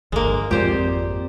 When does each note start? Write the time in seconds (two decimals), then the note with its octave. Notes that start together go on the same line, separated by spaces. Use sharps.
0.12 G1 D2 G#3 A#3
0.51 G#1 F2 F3 G#3 C4 G4 C5 D5